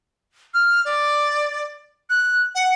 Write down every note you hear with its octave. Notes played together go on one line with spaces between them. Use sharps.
F6
D5
F#6
F#5